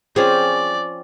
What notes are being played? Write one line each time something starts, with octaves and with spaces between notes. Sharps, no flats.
F3 C4 C#4 G#4 D5